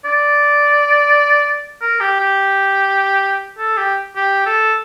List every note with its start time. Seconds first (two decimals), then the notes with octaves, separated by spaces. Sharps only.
0.05 D5
1.81 A#4
2.01 G4
2.20 G4
3.58 A4
3.77 G4
4.16 G4
4.46 A4